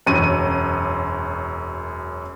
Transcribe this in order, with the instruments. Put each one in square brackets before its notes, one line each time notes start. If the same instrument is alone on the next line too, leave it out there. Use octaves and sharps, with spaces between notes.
[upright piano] E1 F#2 C#4 D#7